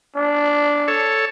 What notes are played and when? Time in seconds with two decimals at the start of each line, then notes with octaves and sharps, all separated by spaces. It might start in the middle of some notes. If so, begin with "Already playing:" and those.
0.15 D4
0.88 A4 C#5